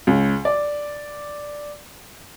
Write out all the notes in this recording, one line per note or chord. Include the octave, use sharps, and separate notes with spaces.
C#2
D5